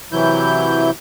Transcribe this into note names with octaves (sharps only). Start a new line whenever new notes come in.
C3 E3 F#3 E4 G6